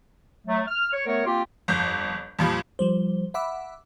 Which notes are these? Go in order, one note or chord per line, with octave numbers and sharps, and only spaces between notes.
F#3 A3
F6
C#5
A3 B3 A#4 C#5
A#3 C4 F4 G4
G1 F2 G6
F2 A#2 F3 G3 B5
F3 G3 C5
E5 F#5 B5 D6 E6